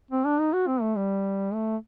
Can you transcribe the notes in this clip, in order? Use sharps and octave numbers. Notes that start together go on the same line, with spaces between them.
C4
D4
D#4
F#4
C4
A3
G3
A3